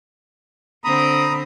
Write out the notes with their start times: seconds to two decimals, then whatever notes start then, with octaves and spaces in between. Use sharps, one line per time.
0.84 D3 C4 A#5 B5 D#6